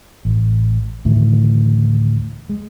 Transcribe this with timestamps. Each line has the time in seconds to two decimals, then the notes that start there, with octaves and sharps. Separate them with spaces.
0.25 A1
1.05 D2 A2 D#3 E3
2.49 G#3